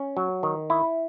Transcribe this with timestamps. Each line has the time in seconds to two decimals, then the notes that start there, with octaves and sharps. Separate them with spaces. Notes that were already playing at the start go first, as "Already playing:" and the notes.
Already playing: C#4
0.17 F#3
0.43 D#3
0.70 E4